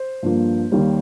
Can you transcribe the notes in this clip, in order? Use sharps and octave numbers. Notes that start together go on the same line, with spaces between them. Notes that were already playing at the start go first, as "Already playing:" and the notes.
Already playing: C5
G2 F3 A#3
D#2 D#3 G3 A#3